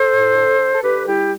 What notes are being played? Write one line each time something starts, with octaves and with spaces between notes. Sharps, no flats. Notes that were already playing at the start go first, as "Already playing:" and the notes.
Already playing: A4 C5
A2
D3
D3
A4
D3 G4 B4
G3 E4 G4